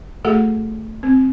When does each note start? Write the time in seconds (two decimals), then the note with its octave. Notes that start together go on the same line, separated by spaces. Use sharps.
0.25 A3 F#4 G#4 A4 F#5
1.03 C4